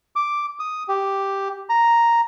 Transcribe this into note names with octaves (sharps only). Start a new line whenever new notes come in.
D6
D#6
G4
A#5